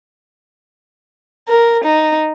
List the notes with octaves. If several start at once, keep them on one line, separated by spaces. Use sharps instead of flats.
A#4
D#4